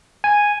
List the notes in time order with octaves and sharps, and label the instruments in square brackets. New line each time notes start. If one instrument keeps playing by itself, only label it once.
[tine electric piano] G#5